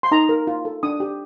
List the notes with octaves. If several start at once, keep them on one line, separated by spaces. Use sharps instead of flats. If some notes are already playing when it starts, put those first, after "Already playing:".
C6
D#4 A#5
A#4
F4
A4
D4 D#6
G4